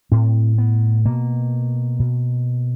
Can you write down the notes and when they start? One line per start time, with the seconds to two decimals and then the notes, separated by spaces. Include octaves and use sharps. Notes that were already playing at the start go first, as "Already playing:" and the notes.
0.12 A2 C4
0.58 B3
1.05 B2 A#3
1.99 B2